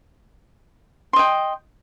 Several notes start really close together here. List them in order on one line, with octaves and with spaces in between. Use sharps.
C6 D#5 G5